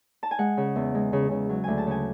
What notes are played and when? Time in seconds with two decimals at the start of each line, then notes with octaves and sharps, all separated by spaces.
0.23 A5
0.31 G#5
0.39 G#3 F#5
0.57 C#3
0.76 E2
0.95 G#3
1.13 C#3
1.31 C#3
1.49 F#3
1.64 D2 G#5
1.78 A5
1.87 C#3 G#5